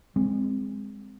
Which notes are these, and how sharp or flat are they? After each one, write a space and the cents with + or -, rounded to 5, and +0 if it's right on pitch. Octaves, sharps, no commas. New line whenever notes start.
G#3 -20 C4 -5